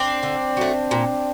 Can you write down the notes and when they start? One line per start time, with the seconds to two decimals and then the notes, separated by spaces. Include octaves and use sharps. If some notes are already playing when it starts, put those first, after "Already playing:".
Already playing: C4 D4
0.23 D3
0.57 F#3 A3
0.91 A#2